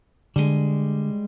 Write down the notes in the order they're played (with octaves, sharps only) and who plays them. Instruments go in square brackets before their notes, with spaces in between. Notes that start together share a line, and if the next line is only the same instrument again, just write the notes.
[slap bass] D3 [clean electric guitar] G3 G#3